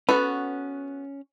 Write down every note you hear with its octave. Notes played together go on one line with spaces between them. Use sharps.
B3 C#4 F#4 A4 B4